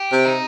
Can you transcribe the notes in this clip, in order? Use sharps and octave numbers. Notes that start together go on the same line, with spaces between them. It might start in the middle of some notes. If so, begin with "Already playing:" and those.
Already playing: G4
C3
D#4